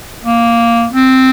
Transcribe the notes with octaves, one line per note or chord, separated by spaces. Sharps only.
A#3
C4